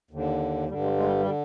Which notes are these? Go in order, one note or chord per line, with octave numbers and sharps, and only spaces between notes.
D#2 D3
G2 D3 G3
G#3
G#3
G3
G3
D3